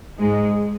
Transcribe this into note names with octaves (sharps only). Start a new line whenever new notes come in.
G#2 G#3